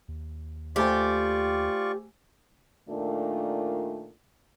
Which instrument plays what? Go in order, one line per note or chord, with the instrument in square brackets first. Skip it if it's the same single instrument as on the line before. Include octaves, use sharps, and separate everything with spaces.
[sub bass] D#2
[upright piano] A3 C5 G#5 [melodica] F4 D5 C#6 [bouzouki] G4
[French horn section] A#2 D#3 A3 D4 F4